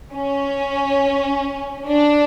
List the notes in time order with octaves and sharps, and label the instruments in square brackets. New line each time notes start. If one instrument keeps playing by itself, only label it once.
[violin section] C#4
D4